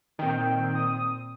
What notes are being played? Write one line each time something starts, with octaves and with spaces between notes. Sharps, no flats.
A#2 D#3 C4 G5
D#6